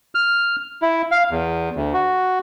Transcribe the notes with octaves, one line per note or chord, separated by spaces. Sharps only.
F6
E4
F5
E2
D2
F#4